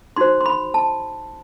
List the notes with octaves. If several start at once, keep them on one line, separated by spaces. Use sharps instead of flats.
D#4 F#4 C5 C6
C6
B5
A5